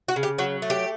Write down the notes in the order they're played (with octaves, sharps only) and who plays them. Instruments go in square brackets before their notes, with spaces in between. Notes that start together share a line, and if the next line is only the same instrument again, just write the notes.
[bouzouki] F#4
C#3
G4
F#3 F#4
A3
G4